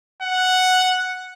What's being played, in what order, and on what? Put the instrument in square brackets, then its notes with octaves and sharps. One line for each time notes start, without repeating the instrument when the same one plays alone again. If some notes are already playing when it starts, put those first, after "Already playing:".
[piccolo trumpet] F#5